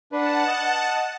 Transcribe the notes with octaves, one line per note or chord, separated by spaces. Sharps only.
D4 B4 F#5 A5
D#5